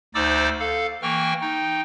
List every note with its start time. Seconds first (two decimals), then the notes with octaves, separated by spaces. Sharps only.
0.14 D2 D#4 C5 D5 D6 E6
0.60 A4 F5
1.02 E3 A#3 G5 C#6 F6
1.41 D#4 G5